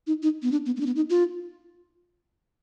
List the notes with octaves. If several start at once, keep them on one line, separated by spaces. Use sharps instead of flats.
D#4
D#4
B3
D4
B3
A#3
D4
B3
D#4
F4